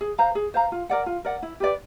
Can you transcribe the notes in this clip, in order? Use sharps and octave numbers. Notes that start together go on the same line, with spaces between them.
G#4
C5 F5 A#5
G#4
C5 F5 A#5
F4
A#4 D5 F#5
F4
A#4 D5 F#5
E4
G4 B4 D5